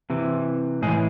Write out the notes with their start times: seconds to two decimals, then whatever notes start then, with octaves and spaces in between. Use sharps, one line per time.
0.10 C3 E3
0.82 A2 E3 G#3 G#4